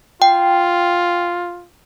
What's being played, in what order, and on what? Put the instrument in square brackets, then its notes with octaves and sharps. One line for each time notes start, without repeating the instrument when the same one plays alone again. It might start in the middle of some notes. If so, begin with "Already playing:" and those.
[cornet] F4 [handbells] G5